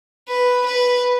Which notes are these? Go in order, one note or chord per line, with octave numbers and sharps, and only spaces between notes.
B4
B4